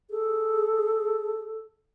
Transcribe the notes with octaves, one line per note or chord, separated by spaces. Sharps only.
G#4 A4